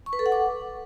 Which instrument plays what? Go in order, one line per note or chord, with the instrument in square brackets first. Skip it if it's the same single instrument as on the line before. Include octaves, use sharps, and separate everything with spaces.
[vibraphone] C#6
B4
A4
F#5
D6